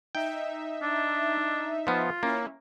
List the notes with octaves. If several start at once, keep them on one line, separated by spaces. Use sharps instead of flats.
D#4 E5 G5
D4
F3 B3 F4
A#3 C#4 E4